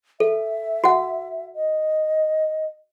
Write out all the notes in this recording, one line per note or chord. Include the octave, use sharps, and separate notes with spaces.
A4 E5
F#4 F#5
D#5